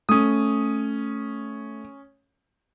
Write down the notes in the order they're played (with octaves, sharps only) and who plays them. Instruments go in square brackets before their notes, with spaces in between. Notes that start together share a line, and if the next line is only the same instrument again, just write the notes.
[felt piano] A3 [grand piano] C#4 D#6